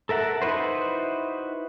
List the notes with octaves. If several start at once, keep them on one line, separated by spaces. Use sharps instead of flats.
A4 A#4 E5 F#5 A5
D#4 E4 F#4 B4 C5